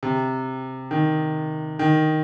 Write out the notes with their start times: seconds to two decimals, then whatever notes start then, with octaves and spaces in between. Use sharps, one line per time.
0.03 C3
0.91 D#3
1.79 D#3